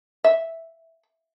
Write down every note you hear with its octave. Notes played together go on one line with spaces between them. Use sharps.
E5